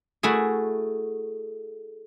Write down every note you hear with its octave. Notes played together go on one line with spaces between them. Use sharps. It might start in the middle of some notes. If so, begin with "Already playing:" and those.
A3 E4 F#4 G#4